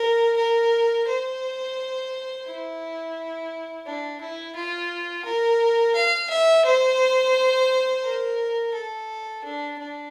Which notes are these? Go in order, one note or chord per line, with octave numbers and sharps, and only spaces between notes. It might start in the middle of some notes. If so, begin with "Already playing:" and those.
Already playing: A#4
A#4
C5
E4
D4
E4
F4
A#4
F5
E5
C5
A#4
A4
D4
D4